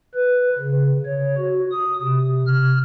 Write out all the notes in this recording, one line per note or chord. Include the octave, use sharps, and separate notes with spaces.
B4
C#3
C#5
F#4
D#6
C3
F6